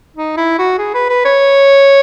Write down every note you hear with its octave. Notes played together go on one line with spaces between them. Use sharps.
D#4
E4
F#4
G#4
B4
B4
C#5